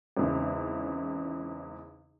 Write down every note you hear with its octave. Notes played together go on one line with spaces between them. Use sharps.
G#1 E2 C#3